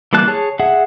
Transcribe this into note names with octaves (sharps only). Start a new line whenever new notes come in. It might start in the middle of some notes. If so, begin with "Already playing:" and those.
E3 G3 A#3 A5 F#6
G#4 C#5 A5
G#4 E5 F#5